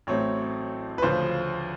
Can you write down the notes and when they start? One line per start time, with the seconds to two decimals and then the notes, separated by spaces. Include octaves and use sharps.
0.07 A1 A2 F#3 A3 C4 C#5
0.98 B4
1.02 D2 C#3 F3 C5